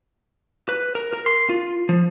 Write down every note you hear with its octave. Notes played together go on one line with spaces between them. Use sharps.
B4
A#4
A#4
C6
F4
F3